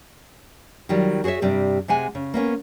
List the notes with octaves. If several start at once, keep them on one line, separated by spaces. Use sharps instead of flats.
D#3 F#3 G3 F4
F#4 G#4 C5 C#5 E5
G2 C3 G3
C3 G#3 F#5 G#5
C#3
A#3 B3 C#4